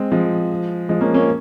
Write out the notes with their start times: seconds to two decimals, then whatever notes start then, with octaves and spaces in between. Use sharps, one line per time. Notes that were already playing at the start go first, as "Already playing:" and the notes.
Already playing: G#3 C4
0.12 F3 G#3
0.89 F3 G#3
1.01 A#3 C#4
1.14 A#3 C#4